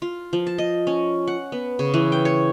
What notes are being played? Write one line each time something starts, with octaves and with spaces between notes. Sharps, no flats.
F4
F3
A5
D#5
C#4
F#5
B3
C#3
E3
G5
C#5